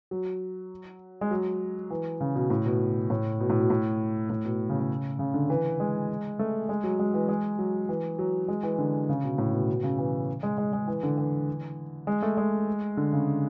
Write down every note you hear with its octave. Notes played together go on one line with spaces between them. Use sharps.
F#3
G#3
F#3
E3
C#3
B2
A2
B2
A2
B2
A2
B2
A2
A2
B2
C#3
C#3
C#3
D3
E3
G#3
A3
G#3
F#3
G#3
E3
G#3
F#3
E3
F#3
G#3
E3
D3
C#3
B2
A2
B2
B2
C#3
E3
G#3
G#3
G#3
E3
D3
E3
G#3
A3
G#3
D3
C#3